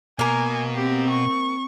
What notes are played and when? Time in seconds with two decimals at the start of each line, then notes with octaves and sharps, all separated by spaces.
0.19 B2 A#3 A#4 G#5
0.76 C4 G4
1.09 C#6